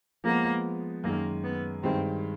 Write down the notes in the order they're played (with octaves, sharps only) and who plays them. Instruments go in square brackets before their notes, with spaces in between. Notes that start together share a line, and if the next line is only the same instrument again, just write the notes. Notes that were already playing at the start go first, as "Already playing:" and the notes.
[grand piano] F3 G#3 B3 [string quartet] A#3
[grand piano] F#2 D#3 G#3 [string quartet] A#3
[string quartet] B3
[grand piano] G2 D#3 G#3 [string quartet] C4